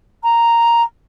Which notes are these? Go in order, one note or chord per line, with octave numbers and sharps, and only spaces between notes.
A#5